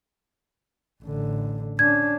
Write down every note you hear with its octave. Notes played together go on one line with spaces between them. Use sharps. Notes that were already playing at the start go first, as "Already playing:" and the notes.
A1 D3
C#4 D4 G#6